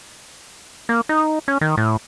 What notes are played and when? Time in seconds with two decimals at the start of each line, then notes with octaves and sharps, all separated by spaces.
0.89 A#3
1.09 D#4
1.48 C#4
1.61 D#3
1.77 A2